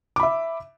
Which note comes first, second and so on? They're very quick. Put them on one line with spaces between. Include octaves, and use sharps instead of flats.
D6 B5 E5